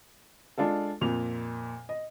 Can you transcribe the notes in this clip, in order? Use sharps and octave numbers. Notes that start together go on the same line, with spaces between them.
G#3 D4 F4 A4
F2 A#2 F7
D#5